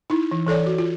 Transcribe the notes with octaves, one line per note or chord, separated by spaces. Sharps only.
D#4 E4
E3
E3 A4 C#5 D5
F#4
F4